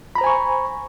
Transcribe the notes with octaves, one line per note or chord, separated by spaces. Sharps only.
C5 G#5 A#5 B5 C#6